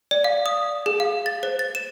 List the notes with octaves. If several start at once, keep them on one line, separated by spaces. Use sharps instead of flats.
D5
F5
D#6
G#4
F5
A6
C5
A6
E7